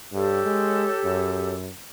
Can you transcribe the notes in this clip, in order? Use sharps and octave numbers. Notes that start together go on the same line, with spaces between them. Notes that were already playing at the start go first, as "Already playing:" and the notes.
G2 G4 A4 C#5
G#3
F#2